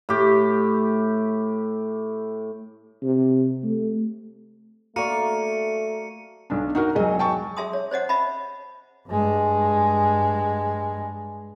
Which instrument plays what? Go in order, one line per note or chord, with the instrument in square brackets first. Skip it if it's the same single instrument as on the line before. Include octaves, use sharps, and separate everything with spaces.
[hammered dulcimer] A2 G4
[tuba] C3
A3
[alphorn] A3 [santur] A#3 C#6 [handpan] F#4 D5 [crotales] C#7 D#7
[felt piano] B1 D4
D#4 F#4 A#4
[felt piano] E1 D#5 [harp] F#3 G#4
[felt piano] G5 A5 C#6
[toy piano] G#4 E5 A5 C6 D#6
C#5
C5 C#5 D#5 F#5
D#5 E5 A5 B5
[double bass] G2 G#3